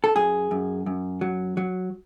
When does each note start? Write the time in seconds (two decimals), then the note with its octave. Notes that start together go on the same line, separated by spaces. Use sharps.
0.04 A4
0.15 F#2 G#4
0.51 F#2
0.86 F#2
1.21 F#3
1.57 F#3